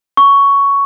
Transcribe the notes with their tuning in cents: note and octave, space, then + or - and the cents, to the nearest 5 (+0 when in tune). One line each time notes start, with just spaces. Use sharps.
C#6 +10